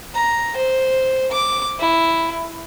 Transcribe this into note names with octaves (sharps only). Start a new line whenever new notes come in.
A#5
C5
D6
E4